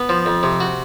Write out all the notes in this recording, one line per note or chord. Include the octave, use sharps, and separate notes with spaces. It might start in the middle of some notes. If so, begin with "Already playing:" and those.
Already playing: B3
F3
F2
C3
F#4